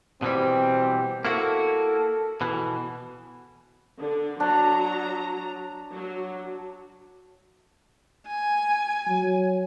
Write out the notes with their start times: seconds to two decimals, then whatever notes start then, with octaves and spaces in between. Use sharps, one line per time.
0.22 B2 E3 G3 C4
1.25 A#3 E4 F#4 A4
2.41 B2 E3
3.98 D3
4.40 F#3 D4 A#5
5.94 F#3
8.27 G#5
9.08 F#3